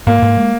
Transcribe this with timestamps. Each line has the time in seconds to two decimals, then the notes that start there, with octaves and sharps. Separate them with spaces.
0.07 G#2 A#3
0.22 G#2
0.37 G#3